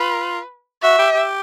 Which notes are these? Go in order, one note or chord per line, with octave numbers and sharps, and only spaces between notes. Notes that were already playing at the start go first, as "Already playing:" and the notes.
Already playing: F4 B4
F#4 E5
G4
G4